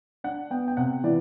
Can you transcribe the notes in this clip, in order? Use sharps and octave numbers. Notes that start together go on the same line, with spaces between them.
D4 F#5
B3 G5
G5
C3 F#5
E3 D5